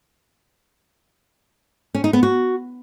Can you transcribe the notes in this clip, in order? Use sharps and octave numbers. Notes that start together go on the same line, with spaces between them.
C#4
D#4
B3
F#4